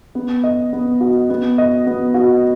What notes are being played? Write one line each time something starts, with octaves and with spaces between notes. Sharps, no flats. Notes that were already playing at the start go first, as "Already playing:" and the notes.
B3
D#5
B3
F#4
B3
D#5
B3
F#4